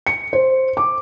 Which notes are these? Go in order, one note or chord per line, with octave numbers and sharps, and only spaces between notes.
C#7
C5
D6